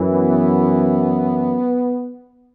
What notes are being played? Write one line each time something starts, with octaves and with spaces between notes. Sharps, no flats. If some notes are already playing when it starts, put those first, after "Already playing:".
Already playing: F#2 E3
B3